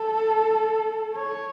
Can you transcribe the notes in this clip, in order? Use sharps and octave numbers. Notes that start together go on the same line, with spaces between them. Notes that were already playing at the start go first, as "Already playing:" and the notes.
Already playing: A4
C#5